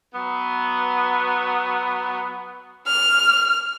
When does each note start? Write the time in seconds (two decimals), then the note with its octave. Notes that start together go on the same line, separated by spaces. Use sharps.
0.14 F#3 B3
2.87 F6